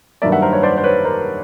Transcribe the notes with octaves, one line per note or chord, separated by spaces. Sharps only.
G2 D#3 F#3 A#3 D5 E5
E5 F#5
A#4 C5
B4 C#5
C5 D5
C5
B4 C#5
A#4 C5